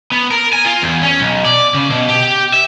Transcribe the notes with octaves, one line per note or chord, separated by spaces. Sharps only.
B3
A#4
G#5
F4
E2
C#4
B1
D5
C#3
B2
G4
E5